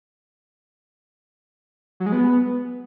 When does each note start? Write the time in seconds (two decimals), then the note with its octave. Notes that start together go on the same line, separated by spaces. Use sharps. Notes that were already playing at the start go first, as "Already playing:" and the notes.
2.00 F#3
2.06 G#3
2.12 B3